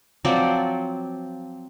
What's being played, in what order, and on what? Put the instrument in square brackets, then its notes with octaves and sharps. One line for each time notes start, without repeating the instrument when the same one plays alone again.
[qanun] F3 F#3 C4 D5